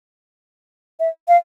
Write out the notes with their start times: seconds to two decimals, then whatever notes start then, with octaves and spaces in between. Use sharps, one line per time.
1.00 E5
1.28 F5